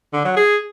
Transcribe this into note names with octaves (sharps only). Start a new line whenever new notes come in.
D3
F#3
G#4